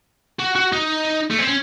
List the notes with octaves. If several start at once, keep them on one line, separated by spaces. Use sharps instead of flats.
F#4
F#4
D#4
A3
C4
C#4